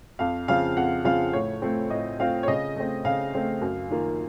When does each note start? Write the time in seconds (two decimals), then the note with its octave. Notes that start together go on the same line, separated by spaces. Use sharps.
0.19 F2 F5
0.48 C#3 F3 C4 F4 F5
0.76 F2 F#5
1.05 C#3 F3 C4 F4 F5
1.33 A2 C#5
1.62 A3 C4 F4
1.90 A2 D#5
2.19 A3 C4 F4 F5
2.43 C#5
2.48 C#3 D#5
2.76 A3 C4
3.05 C#3 F5
3.34 A3 C4
3.61 F#2
3.90 D#3 A#3 F4